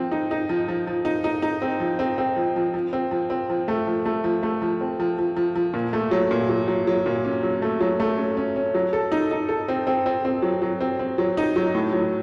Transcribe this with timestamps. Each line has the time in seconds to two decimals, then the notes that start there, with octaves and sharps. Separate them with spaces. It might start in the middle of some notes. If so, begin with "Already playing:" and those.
Already playing: F3 C4
0.12 D#4
0.31 D#4
0.49 F3
0.68 F3
0.87 F3
1.05 D#4
1.24 D#4
1.42 D#4
1.62 C4
1.80 F3
1.99 C4
2.18 C4
2.36 F3
2.56 F3
2.74 F3
2.93 C4
3.11 F3
3.30 C4
3.50 F3
3.68 A3
3.87 F3
4.06 A3
4.24 F3
4.43 A3
4.62 F3
4.81 C4
5.00 F3
5.19 F3
5.37 F3
5.56 F3
5.74 A#2
5.93 A3
6.11 F#3
6.31 A#2
6.49 F#3
6.68 F#3
6.87 F#3
7.06 A#2
7.25 C#4
7.43 F#3
7.62 A3
7.81 F#3
8.00 A3
8.17 C#4
8.37 C#4
8.56 C#4
8.75 F#3
8.93 A4
9.12 D#4
9.31 D#4
9.49 A4
9.68 C4
9.87 C4
10.06 C4
10.25 C4
10.42 F#3
10.62 F#3
10.81 C4
10.99 C4
11.18 F#3
11.37 D#4
11.56 F#3
11.75 A2
11.93 F#3